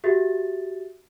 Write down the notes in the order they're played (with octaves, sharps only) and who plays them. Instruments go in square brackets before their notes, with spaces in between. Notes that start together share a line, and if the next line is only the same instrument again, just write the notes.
[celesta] F#4 G4 E5 A6